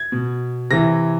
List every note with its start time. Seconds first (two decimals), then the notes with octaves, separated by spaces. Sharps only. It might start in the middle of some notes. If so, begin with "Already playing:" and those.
Already playing: G#6
0.12 B2
0.70 C3 E3 A#6